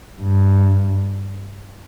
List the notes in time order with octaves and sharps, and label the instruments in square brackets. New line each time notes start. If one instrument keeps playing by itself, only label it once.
[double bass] G2